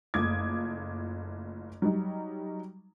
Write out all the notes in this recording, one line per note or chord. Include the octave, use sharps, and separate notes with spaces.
F#1 A3 F4 D6 D#6 G#6
F#3 G3 D#4